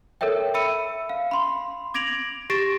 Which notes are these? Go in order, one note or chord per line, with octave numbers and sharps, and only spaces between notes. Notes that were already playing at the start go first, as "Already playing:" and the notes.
A4 A#4 C#5 E5 G5
E5 B5 E6 C#7 D#7
F5
B5 C6
D6 G#6 A#6 D7 F7 F#7
G4 C#6 A6 A#6 D7 E7